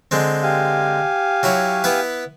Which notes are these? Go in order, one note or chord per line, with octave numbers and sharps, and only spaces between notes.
D3 G#3 C4
G4 F5 G#5
F#3 E4 C#5
B3 E4 B4